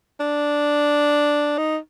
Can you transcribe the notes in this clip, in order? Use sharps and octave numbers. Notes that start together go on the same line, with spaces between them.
D4
D#4